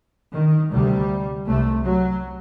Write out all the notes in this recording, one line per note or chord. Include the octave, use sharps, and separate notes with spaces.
D#3
D2 C3 G3
C2 C3 A3
F#3